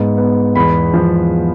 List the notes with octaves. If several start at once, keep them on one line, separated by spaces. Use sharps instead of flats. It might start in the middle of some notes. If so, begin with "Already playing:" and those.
Already playing: G#2 B3
B3
E2 B5
F3